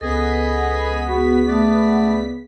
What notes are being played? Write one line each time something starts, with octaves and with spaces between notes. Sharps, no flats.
C#2 B3 G#4 A4 D#5 B6
F#4 G#4
A3 D5